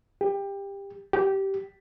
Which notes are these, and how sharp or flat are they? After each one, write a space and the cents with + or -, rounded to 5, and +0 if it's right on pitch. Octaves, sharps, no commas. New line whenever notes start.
G4 +20
G4 -15